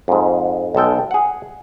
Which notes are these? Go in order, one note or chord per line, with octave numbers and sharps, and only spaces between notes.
F2 G#2
B1 G#3 A4 G5
G#4 F#5